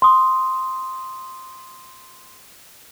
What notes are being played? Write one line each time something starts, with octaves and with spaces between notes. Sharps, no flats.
C6 D#6